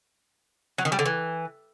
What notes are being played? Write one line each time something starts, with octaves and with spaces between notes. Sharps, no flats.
F#3
D#3
G3
D3
E3